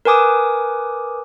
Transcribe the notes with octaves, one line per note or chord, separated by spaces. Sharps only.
A#4 B4 G#5 D6 D#6